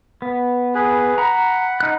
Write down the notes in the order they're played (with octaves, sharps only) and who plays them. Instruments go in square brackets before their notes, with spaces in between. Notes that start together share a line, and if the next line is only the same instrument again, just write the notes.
[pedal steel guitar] B3
[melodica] G#4 B4
[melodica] F#5 B5 [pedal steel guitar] A#5
[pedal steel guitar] D#4 F#6